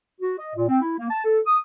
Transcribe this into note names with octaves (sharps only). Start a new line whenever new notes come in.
F#4
D#5
A#2
C4
E4
A#3
A5
A4
D#6